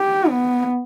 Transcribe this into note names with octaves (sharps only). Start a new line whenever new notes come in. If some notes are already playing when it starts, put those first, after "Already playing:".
Already playing: G4
B3